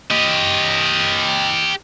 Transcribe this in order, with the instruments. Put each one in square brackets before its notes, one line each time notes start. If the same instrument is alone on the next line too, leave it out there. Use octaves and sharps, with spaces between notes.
[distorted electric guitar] G4 D#5